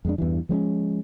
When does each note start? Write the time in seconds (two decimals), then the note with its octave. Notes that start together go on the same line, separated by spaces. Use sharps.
0.05 F2 G#3 D4
0.18 E2 G2 E3
0.49 F3 G#3 C4 C#4